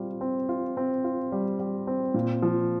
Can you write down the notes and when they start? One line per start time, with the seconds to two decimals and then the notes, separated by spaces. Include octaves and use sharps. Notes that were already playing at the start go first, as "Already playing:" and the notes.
Already playing: G3 C4 F4
0.21 C4
0.49 F4
0.77 C4
1.04 F4
1.32 G3
1.59 G3
1.87 C4
2.14 A#2
2.42 F3